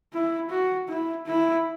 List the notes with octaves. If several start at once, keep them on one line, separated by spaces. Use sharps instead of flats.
E4
F#4
E4
E4